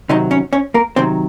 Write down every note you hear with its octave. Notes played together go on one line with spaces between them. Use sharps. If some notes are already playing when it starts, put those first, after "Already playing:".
C3 D#3 F#3 D#4 D#5
C#4 C#5
C#4 C#5
A#3 A#4
C3 D#3 F#3 C4 C5